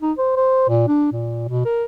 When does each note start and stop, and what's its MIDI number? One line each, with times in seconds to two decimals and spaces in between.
0.02 0.12 63
0.18 0.35 72
0.36 0.66 72
0.69 0.85 46
0.87 1.08 62
1.12 1.45 46
1.48 1.65 47
1.65 1.85 70